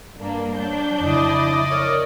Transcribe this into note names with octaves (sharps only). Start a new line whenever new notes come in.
G2 A#3 D4
F#3 D4 G6
F2 C#3 E4 D5 D#5
A#4 C#5